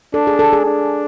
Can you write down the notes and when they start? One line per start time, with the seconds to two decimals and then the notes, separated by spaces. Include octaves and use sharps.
0.14 D4 A4
0.27 G#4
0.39 A4
0.53 G#4
0.66 D4